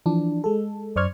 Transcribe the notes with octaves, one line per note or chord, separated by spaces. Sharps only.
E3 F3 D4
G#3 A4
F#2 C5 D5 C#6 F6 G#6